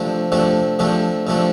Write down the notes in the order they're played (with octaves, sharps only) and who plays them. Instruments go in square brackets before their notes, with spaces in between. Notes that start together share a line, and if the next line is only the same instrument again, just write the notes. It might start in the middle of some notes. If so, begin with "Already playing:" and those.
Already playing: [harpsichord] C3 F3 A3 D4
C3 F3 A3 D4
C3 F3 A3 D4
C3 F3 A3 D4